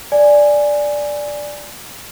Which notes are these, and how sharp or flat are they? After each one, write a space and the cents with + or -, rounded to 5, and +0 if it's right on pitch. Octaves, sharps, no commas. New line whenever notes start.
D5 +0 G#5 +0